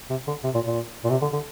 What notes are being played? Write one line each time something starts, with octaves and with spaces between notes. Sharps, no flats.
C3
D3
C3
A#2
A#2
A#2
C3
D3
D3